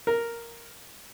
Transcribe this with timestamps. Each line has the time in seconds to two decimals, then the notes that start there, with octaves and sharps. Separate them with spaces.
0.07 A#4